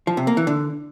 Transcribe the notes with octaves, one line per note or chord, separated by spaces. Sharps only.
F3
C3
A#3
E3
D3